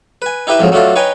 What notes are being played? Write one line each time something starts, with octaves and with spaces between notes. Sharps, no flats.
B4 G#5
D#4 E4 G4 B4 D#5 E5
F2 G#2 F3 F#3
F#3 A3 D4 F4 A4
D#4 B4 C#5 G5 G#5 D#6